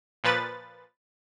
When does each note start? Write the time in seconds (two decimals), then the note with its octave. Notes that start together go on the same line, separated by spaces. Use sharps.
0.24 A#2 F3 B4 A6